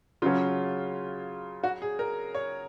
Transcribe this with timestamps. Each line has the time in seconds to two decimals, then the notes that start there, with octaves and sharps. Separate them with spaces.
0.22 C#3 F#3 C#4 F4
1.63 F#4
1.82 G#4
1.99 A#4
2.35 C#5